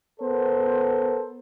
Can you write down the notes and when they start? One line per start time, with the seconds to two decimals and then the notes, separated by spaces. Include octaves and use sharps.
0.20 B3 A4 A#4 C5